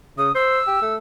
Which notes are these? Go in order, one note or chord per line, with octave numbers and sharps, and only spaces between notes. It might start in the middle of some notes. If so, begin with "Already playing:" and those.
C#3 D#6
C5 E6
G4
A3